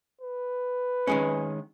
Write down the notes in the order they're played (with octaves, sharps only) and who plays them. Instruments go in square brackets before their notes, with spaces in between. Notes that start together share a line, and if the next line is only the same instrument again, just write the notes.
[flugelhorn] B4
[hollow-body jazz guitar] D#3 G#3 C#4